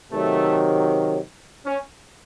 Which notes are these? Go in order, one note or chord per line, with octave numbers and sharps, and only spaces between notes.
C3 D#3 F#3 A3
C#4